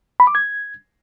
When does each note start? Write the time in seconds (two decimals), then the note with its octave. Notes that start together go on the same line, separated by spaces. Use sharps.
0.20 B5
0.27 D6
0.35 G#6